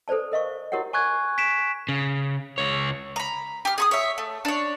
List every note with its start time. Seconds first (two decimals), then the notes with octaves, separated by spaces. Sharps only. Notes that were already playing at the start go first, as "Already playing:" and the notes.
0.08 A4 B4 C5 D5 A5
0.32 A#4 D#5 F5 C#6
0.72 E4 F#4 G4 A#4 C#5 F#5
0.93 G#5 C#6 F#6 G#6
1.38 B6 D7 E7
1.89 C#3
2.58 C#2 C#5
3.16 A#5 B5
3.65 G4 F6
3.78 G#4 C#6 D#6
3.91 C#5 E5
4.18 A3
4.45 D4 C#5